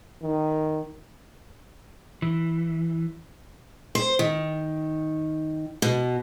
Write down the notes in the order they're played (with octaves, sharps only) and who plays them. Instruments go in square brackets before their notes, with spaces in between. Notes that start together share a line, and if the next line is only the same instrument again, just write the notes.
[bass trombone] D#3
[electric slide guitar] E3
[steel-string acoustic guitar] C5
D#3
B2